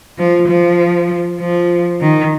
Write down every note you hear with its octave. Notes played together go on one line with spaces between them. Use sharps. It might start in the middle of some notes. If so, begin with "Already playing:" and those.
F3
F3
F3
D#3